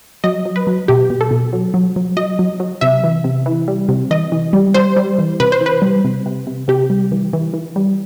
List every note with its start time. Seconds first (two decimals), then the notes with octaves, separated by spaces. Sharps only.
0.24 F#3 D#5
0.45 F#3
0.56 B4
0.67 F#3
0.88 B2 G4
1.10 B2
1.21 A4
1.31 B2
1.53 F#3
1.74 F#3
1.96 F#3
2.17 F#3 D#5
2.39 F#3
2.60 F#3
2.81 C3 E5
3.04 E3
3.24 C3
3.46 E3
3.68 G3
3.89 C3
4.11 E3 D#5
4.32 E3
4.53 G3
4.74 G3 C5
4.97 G3
5.19 E3
5.40 C3 B4
5.52 C5
5.61 E3
5.66 B4
5.82 G3
6.04 C3
6.26 C3
6.47 C3
6.68 C3 G4
6.90 G3
7.12 E3
7.33 E3
7.54 E3
7.76 G3